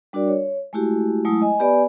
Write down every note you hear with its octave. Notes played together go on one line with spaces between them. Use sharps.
G3 D4 F#4 A#4 D5
C#5
G#3 A3 E4 F#4 G4
F#3 G#3 A3 E4 D#6
D#5 G#5
B3 G4 B4 D5 G#5 B5